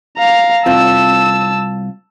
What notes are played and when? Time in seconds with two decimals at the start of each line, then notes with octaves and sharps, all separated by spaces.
0.17 F5 A#5
0.66 C2 C4 F4 A5 E6